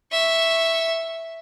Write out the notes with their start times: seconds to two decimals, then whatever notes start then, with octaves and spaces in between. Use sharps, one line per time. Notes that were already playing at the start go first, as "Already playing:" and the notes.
0.12 E5 C#6